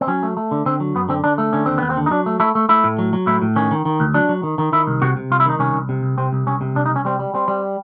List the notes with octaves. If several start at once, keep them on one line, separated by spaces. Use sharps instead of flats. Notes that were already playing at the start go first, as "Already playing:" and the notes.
C4
F#3 C#4
A3
A3
D3
D3 C4
F#3
F#2 B3
D3 C4
D3 D4
A3
D3 C#4
D#2 C4
D#2 B3
C4
D3
D#4
F#3 D4
A3
A3 E4
A3
A3 E4
A2
F#3
F#3
A2 E4
A2
D#3 C#4
D#3
D#3
D2
F#3 D4
F#3
D#3
D#3
D#3 E4
C2
C3 F#4
C3
C2 F4
E4
D#3 D#4
C2 C#4
C2
C3
C2
C3 C4
C2
C2 C#4
C3
C2 D4
D#4
C2
C#4
G3 C4
G3
G3 C4
G3